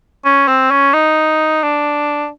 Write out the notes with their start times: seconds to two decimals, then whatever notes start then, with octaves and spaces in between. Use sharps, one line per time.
0.25 C#4
0.48 C4
0.71 C#4
0.94 D#4
1.63 D4